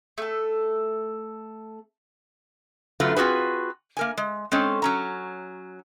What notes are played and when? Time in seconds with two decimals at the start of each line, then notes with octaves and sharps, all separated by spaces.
0.18 A3 A4
3.00 F#2 D3 F#3 A3 F4 B4
3.17 C4 F4 F#4 G#4 B4
3.97 A#3 A#4 G#5
4.17 G#3
4.52 G#3 C4 C#4 A4
4.82 F#3 C#4 A#5